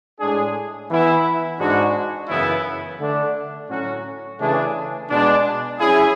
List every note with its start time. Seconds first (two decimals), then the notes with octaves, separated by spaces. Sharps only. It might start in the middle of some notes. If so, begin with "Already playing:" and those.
0.19 A2 G#3 D4 G#4
0.89 E3 B3 E4
1.59 G#2 G#3 D4 F#4
2.29 F#2 C#3 E3 B3 E4
2.99 D3 A3 D4
3.69 A2 F#3 C#4 F#4
4.39 C#3 E3 A3 D4 G#4
5.09 B2 G#3 D4
5.80 F#3 C#4 E4 G#4